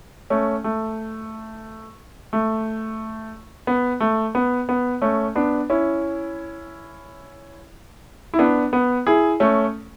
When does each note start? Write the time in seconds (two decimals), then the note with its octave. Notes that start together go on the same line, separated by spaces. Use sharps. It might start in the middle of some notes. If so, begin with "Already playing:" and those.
0.30 A3 C#4
0.64 A3
2.33 A3
3.67 B3
4.00 A3
4.35 B3
4.69 B3
5.02 A3 C#4
5.35 B3 D4
5.70 C#4 E4
8.34 E4
8.39 B3 D4
8.73 B3
9.07 E4 G#4
9.40 A3 C#4